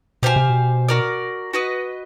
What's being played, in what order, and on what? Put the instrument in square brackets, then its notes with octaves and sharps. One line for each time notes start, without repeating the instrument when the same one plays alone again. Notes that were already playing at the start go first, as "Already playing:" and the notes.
[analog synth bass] B2 [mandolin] G4 C5 F5 G#5
[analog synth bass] C3
B2
[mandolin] F#4 A#4 D5
F#4 B4 D#5